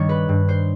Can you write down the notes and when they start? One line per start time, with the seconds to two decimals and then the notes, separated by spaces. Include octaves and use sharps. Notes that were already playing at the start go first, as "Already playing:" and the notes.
Already playing: G2 D#3 G3 C#5
0.09 B4
0.29 G2
0.49 C5